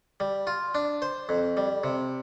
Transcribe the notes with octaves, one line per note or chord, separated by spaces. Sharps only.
G3
F4
D4
C5
F2
G3
C3